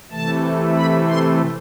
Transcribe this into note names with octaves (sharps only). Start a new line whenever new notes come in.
C3 E3 A3 A5
B5
C6